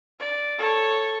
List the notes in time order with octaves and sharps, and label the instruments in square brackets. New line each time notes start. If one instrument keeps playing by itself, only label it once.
[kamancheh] D5
A4 C#5